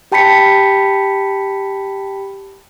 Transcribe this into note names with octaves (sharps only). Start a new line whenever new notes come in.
G4 G5 A5 B5 B6 C#7